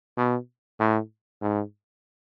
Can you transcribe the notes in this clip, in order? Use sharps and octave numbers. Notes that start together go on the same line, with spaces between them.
B2
A2
G#2